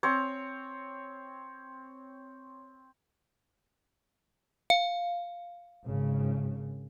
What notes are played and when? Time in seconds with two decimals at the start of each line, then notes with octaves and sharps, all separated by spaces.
0.03 C4 C#5
4.70 F5
5.85 G#1 C#3